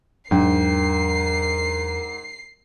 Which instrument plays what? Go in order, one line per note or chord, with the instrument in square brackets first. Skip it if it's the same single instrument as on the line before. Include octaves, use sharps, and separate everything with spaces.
[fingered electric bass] E2 F#3 D4 [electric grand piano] G#2 G5 [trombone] A#4 [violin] C7